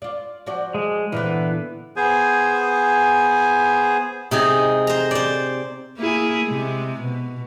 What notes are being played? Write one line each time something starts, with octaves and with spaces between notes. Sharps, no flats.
F4 D5
F3 F#4 D5
G#3
A#2 D3 E3 B3
B3 G#4 C5 G#5
C3 D#4 G#4
C5 A#5
C5 D5
A#3 E4 G#4
C3 G#3
B2